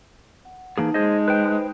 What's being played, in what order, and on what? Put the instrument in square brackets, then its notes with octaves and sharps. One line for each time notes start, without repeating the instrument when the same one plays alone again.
[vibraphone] F#5
[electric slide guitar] E3 A#3 G#4 [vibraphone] D#4 A5
[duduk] G#3 [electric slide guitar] G#4 C5 D#5
[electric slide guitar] B4 C5 G5